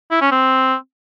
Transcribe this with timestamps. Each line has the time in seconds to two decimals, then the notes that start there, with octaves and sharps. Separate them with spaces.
0.11 E4
0.21 C#4
0.32 C4